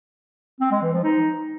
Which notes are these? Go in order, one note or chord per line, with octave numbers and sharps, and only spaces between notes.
C4
G#3
E3
F3
D#4